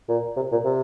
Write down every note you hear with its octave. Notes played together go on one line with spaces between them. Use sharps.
A#2
C3
A#2
C3